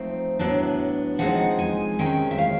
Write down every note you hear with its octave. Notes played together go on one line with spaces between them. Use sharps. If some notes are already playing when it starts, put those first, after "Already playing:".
Already playing: F3 A3 C4 D#4
A2 F#3 B3 D4
F3 G#3 C4 D#4 F#5
G#5
C3 D#3 G#3 C#4 G5
E5
F5